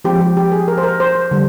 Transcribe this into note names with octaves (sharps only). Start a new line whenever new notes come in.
F3 G#3 C4 G4
G4
G4
G#4
A#4
C5
A#4
C5
C5
D3 G3